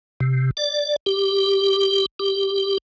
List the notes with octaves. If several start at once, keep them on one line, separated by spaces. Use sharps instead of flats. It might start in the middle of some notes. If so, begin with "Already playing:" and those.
C3
D5
G4
G4